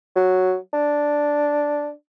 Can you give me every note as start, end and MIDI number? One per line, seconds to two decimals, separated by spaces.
0.16 0.56 54
0.73 1.90 62